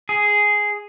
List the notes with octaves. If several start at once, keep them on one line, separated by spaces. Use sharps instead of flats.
G#4